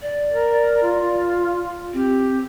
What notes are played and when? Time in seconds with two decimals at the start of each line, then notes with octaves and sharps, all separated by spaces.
0.02 D5
0.32 A#4
0.82 F4
1.94 C4 G4